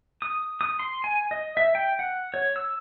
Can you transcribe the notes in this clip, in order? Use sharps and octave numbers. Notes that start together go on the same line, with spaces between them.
D#6
D#6
C6
G#5
D#5
E5
G5
F#5
C#5
E6